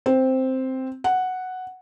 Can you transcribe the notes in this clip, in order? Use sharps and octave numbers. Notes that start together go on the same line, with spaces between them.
C4
F#5